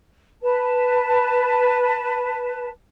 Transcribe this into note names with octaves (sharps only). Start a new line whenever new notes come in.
B4 A5